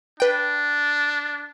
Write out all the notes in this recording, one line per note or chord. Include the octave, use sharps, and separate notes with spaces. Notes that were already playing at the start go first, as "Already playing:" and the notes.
D4 B4 G5